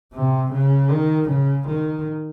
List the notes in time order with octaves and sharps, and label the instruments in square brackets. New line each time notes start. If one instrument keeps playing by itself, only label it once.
[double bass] C3
C#3
D#3
C#3
D#3